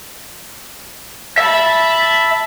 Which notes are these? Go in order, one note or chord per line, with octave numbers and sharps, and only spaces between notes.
E5 A5 B5